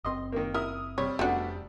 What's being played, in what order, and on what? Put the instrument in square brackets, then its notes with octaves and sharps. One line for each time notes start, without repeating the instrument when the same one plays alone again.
[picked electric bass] F#1 C4 [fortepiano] D#5 C6
[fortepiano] D#3 A#3
[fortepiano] E4 [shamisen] A#4 [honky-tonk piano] D#6 F6
[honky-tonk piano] C3 G3 [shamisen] C#5
[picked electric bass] F1 [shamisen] A3 B3 F#4 [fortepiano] D4 G5